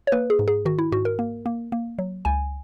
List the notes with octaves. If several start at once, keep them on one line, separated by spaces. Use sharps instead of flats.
C#5
A#3 B4
G#4
G#2
G#4
D#3 F#4
E4
G#2 F#4
A#4
A#3
A#3
A#3
F#3
C#2 G#5